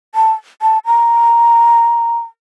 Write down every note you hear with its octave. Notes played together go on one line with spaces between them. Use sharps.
A5
A5
A#5